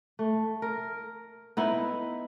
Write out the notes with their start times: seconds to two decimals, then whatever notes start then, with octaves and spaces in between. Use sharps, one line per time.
0.19 A3
0.62 A#4
1.57 B3 D#4 E4